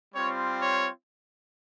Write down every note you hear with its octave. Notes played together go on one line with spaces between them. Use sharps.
G3 C4 F4 C#5
C#5